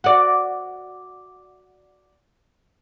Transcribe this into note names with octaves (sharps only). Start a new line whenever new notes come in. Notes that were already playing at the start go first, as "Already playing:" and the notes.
F#4 D5